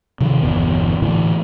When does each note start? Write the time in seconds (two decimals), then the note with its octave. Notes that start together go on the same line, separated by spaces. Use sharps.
0.20 C3 D#3 F3
0.42 G1 E2 B2
1.02 A2 D3 E3